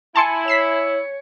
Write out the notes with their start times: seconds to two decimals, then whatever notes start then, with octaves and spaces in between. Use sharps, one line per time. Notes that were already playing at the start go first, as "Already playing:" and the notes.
0.16 E4 G#5 A5 C6 C#7
0.48 C#5 B6 C7 E7